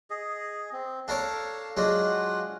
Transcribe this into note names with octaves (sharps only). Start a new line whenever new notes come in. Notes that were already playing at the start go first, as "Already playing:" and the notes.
G#4 D#5
C4
D4 A4 A#4 C#5 F5
F#3 G#3 D4 F4 F#5